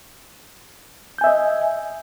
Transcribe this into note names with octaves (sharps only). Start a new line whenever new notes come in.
D#5 E5 G#5 G6